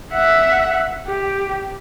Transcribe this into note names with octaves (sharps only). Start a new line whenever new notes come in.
E5 F#5
G4